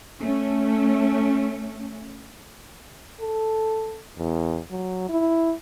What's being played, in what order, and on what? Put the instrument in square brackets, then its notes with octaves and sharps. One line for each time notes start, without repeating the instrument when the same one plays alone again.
[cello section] A3 C#4
[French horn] A4
E2
F#3
E4